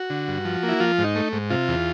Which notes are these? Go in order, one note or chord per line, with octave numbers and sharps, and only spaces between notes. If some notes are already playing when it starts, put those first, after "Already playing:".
Already playing: F#4
D3
G2
F3
A#3
E4
F3 F4
G#2
D#4
A3
G#2
C3 F4
E2